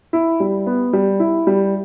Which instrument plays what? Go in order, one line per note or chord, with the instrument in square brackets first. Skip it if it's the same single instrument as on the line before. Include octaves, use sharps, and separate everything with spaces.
[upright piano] E4
G3
B3
G3
E4
G3